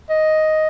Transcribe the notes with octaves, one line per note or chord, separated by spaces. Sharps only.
D#5